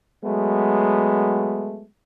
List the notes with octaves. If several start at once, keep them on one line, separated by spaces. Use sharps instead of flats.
F#3 G#3 A3 B3